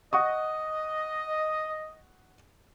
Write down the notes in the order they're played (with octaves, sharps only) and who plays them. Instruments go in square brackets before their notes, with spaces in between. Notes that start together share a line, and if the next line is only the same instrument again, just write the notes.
[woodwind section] D#5 [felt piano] F#5 C#6 D#6